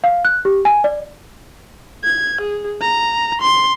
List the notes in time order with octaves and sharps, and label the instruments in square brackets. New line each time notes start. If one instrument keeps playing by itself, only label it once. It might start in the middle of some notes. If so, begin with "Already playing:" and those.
[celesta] F5
F#6
G4
G#5
D5
[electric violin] G#6
G#4
A#5
C6